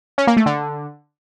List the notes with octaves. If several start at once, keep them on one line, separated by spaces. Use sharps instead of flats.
C#4
A#3
A3
D3